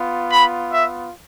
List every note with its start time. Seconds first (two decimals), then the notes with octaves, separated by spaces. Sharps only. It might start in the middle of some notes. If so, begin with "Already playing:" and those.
Already playing: B3 F4
0.32 B5
0.72 E5